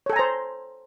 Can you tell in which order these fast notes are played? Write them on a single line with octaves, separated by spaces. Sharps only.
C#5 A4 G#5 A#5 C5